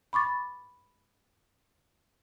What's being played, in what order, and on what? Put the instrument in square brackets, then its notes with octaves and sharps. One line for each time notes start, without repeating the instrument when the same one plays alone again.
[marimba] B5 C#6 D6 A6